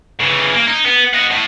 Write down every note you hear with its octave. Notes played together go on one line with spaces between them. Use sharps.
C#3 E3
A#3
D#4
B3
D#5 F#5
A2